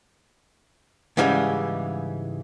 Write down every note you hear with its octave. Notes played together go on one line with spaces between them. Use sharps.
G#2 C#3 E3 G3 G#3